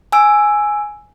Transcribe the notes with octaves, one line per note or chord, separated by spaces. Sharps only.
G#5 E6 D7